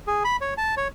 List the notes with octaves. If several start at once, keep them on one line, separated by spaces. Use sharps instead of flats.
G#4
B5
C#5
A5
C#5